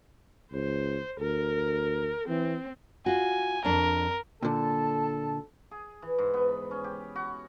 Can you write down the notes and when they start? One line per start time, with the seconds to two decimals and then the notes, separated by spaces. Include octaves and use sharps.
0.53 C#2 C5
1.20 D2 A#4
2.29 E3 C4
3.06 F4 F#4 G#5
3.64 F2 D4 A#4
4.42 A#2 D3 A4 A5
5.71 G#4
6.02 E3
6.18 G#2
6.34 B3
6.49 B5
6.71 C#4
6.84 G4
7.16 F#4